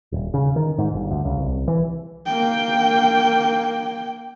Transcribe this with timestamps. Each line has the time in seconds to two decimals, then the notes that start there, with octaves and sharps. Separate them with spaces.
0.12 D#1
0.34 C#3
0.56 D#3
0.78 G#2
0.94 G1
1.11 D2
1.25 C#2
1.37 C2
1.68 E3
2.26 A#3 G5